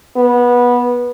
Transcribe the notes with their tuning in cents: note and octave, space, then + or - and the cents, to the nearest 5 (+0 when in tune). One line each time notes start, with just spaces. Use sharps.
B3 -20